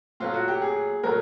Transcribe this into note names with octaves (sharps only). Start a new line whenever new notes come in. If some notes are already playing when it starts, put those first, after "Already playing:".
A#2 F#3 A3 F4
F#4
G4
G#4
A#2 F#3 A3 A#4